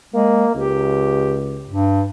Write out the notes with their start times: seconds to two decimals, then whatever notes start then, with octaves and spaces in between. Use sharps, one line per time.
0.14 G#3 A#3
0.55 C#2 G4
1.69 G2